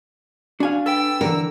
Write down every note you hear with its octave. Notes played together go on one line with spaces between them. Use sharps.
D4 F#4 F5 G#5
A4 B4 G5 E6
D3 E3 A#4